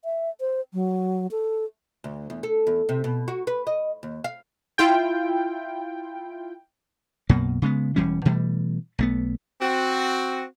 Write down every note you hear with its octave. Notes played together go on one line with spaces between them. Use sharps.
E5
C5
F#3
A4
D2
E2
A4
E2
C3
B2
F#4
B4
D#5
D#2
F5
E4 F4 G5
B1 F#2 B2 A#3
C#3 G#3 B3
E1 E3 G3 C#4
B2 E3 G3 A3
B1 A3 B3
C4 F#4